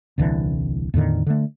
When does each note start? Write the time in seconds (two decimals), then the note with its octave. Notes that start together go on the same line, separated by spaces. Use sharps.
0.18 D#1 C2 D3 E3
0.94 E2 A2 D3 D#3
1.27 D3 A3